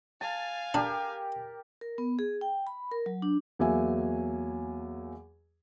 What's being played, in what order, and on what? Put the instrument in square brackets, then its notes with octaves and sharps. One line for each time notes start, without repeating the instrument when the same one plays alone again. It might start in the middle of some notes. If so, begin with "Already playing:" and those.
[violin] F5 G#5 [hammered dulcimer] A5
[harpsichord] D4 [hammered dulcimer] G4 A#4
[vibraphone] A#4
B3
G#4
G5
B5
A#4
F#3
D4
[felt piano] E2 F#3 A#3 E5 G#5